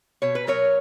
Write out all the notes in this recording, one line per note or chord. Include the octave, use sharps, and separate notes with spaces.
B2 C#5
B4
F#3 A#4 C#5